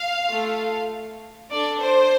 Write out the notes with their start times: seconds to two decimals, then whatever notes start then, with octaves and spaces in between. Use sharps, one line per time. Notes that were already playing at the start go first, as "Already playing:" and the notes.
Already playing: F5
0.30 A3 F4 A4
1.50 D4 A4 D5
1.80 C5